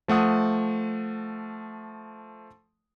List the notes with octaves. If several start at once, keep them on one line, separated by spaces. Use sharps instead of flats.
F3 A3 F#5 D#6